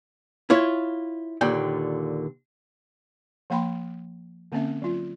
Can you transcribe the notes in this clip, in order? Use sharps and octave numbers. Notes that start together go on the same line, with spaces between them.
E4 F4 C#5
D#2 A#2 D3 G5
F3 A#3 G5 B5 C6
D3 A#3 C4 C#4 E5
F#3 F4